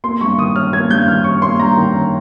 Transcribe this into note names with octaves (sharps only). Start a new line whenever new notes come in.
A#3 C6
G2 C#6
D#3 D#6
C#4 F6
A#3 G#6
G2 G6
D#3 F6
C#4 C#6
A#3 C6
G2 A#5
D#3
C#4